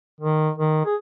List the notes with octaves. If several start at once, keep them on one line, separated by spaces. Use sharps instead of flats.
D#3
D#3
G#4